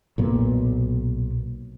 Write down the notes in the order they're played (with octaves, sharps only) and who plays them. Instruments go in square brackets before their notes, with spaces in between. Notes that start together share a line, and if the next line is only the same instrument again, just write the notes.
[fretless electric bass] B1 A#2 B3